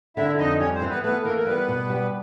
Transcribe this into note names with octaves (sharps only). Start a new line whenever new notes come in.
D3 E4 E5
F2 D#4 D#5
G3 C#4 C#5
C4 C5
E3
B3 B4
A3 B3 B4
E3 A#3 A#4
A#4
G3 B3 B4
B2
G3